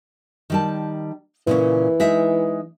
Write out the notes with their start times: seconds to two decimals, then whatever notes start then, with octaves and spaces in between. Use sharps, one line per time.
0.50 D#3 G3 A5
1.47 A#2 C#3 E3 C#4
2.00 G#3 D#4 E5